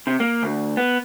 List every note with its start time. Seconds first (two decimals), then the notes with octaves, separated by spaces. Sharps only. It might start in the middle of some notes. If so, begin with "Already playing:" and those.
0.07 C3
0.20 A#3
0.43 D2
0.77 B3